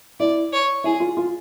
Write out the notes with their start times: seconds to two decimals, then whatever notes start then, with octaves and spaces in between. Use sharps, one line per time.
0.20 E4 D5
0.53 C#5
0.84 E4 G#4
1.00 F4
1.17 F4